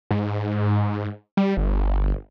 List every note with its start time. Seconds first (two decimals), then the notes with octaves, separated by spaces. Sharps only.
0.11 G#2
1.37 G3
1.57 G1